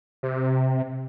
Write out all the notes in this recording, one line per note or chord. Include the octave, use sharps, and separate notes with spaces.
C3